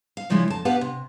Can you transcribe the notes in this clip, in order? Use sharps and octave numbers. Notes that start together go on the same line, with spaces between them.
F5
C#3 F3 G3 G#3 E4
F2 A5
B3 G4 B4 F5 F#5
C3